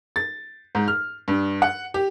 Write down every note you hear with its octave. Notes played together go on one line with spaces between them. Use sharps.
A6
G#2
F6
G2
F#5
G4